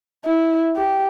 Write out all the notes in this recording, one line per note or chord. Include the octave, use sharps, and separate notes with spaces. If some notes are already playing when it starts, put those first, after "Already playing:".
E4
G4